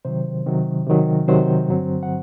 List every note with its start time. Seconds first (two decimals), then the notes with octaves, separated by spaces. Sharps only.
0.05 C3 D#3 F#3 C5
0.46 C3 D#3 F#3
0.87 C3 D#3 F#3
1.28 C3 D#3 F#3 C5
1.68 G2 D3 F#3 C4
2.03 F#5